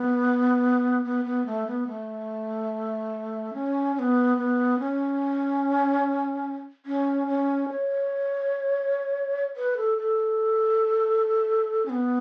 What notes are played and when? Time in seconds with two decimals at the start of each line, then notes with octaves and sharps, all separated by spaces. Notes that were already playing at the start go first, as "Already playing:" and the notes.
Already playing: B3
1.05 B3
1.25 B3
1.46 A3
1.67 B3
1.87 A3
3.53 C#4
3.95 C#4
3.99 B3
4.37 B3
4.79 C#4
6.86 C#4
7.28 C#4
7.69 C#5
9.56 B4
9.77 A4
9.98 A4
11.86 C#4
11.89 B3